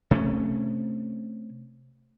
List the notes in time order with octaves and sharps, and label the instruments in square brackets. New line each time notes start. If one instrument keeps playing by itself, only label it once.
[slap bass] C3 A3 A#3 C#4